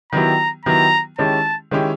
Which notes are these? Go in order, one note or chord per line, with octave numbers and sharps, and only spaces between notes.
D#3 F#3 B3 E4 G4 A#5
D#3 F#3 B3 E4 G4 A#5
D#3 G#3 C#4 E4 G4 A5
D#3 G#3 C#4 E4 G4